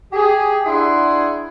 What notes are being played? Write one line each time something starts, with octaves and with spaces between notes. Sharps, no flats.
G4 G#4
D4 E4 G#4 F#5 C6